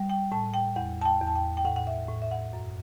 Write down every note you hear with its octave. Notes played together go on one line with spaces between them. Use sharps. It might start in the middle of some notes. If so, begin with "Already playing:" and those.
Already playing: G3
G5
A2 A5
G5
E2 F#5
A5
G5
E2
A5
G5
G5
A2 F#5
F#5
E5
A2
E5
F#5
F#2